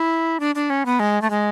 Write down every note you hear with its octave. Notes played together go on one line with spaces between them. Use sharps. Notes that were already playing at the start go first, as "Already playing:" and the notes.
Already playing: E4
D4
D4
C#4
B3
G#3
A3
G#3